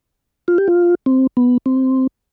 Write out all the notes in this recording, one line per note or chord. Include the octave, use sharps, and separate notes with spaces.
F4
G4
F4
C4
B3
C4